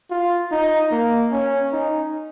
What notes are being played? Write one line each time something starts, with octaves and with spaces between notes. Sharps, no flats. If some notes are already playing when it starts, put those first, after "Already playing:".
F4
D#4
A#3
C#4
D#4